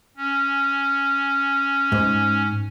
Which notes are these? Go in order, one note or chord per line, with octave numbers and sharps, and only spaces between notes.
C#4
G#2